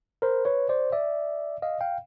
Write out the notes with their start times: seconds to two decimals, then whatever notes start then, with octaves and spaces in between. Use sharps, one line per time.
0.22 A#4 C5
0.45 B4 C#5
0.69 C5 D5
0.92 D5 E5
1.62 D#5 F5
1.81 F5 G5